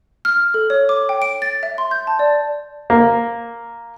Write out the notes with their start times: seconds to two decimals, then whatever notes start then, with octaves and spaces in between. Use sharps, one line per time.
0.25 F6
0.54 A4
0.70 C#5
0.89 D6
1.09 G5
1.22 D7
1.42 A6
1.63 E5
1.78 C6
1.91 G6
2.07 A5
2.19 D5
2.90 A#3